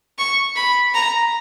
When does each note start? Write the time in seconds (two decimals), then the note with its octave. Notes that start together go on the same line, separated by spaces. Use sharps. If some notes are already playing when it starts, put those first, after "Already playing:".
0.18 C#6
0.56 B5
0.94 A#5